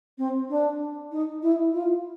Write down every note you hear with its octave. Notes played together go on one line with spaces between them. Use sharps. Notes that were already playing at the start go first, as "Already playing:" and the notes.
C4
D4
D#4
E4
F4